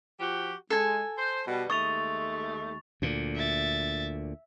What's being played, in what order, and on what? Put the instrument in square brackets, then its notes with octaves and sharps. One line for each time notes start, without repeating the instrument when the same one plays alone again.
[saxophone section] F3 F#4 G4
[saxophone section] G#3 [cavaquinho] A4 G#5
[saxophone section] C5
B2 G3
[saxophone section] D#2 G#3 A3 [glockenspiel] C#6 A6 F7 [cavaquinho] D#6
[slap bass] D2 A#2
[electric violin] E5 A6